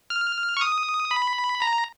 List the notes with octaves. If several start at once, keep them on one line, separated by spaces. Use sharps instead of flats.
F6
C#6
D#6
B5
A#5